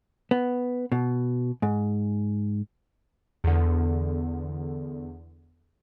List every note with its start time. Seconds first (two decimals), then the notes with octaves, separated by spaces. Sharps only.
0.31 B3
0.92 B2
1.62 G#2
3.44 E2 D3